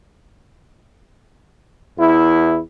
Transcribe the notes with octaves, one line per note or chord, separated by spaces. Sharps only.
E2 E4